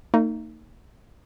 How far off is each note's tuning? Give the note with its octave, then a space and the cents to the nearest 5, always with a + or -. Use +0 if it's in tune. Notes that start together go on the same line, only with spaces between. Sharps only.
A#3 -40 D#4 +0